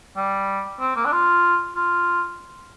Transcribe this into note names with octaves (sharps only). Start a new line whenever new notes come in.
G3
C4
A#3
D4
F4
F4